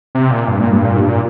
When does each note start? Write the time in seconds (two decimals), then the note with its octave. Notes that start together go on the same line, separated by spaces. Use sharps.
0.15 C3
0.31 A#2
0.48 G2
0.60 A#2
0.72 G2
0.85 A#2
0.97 G2
1.09 A#2